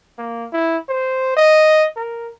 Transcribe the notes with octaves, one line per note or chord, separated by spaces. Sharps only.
A#3
E4
C5
D#5
A#4